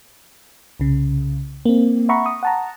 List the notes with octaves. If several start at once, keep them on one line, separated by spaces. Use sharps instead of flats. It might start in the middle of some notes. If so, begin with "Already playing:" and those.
C2 C#3
A#3 C4
E5 F#5 A#5 B5 C#6
D#6
F#5 A5 A#5